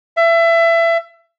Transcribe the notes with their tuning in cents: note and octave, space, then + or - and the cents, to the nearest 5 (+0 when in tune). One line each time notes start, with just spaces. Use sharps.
E5 +25